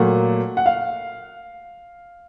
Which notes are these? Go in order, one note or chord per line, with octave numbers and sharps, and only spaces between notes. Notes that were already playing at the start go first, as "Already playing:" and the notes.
Already playing: A#2 F#3 A3 F#5
F#5
F5